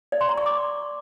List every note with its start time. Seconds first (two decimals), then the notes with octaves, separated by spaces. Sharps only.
0.12 D5
0.21 C6
0.29 A#5
0.38 C#6
0.46 D6